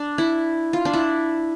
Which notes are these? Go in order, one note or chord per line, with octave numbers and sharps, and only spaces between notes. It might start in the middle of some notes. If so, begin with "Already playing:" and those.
Already playing: D4
E4
F4
D4
E4